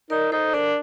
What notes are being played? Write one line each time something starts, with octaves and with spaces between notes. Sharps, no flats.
D#4 A#4 D5
D#4 A4 C5
D4 A#4 D5